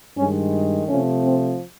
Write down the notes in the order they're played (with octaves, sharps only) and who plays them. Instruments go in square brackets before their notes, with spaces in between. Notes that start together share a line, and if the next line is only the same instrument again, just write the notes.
[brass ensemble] G2 D#3 G#3 C#4
C3 F3 A3 C#4
C4